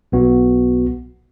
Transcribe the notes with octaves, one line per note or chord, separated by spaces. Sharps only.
B1 B3 F#4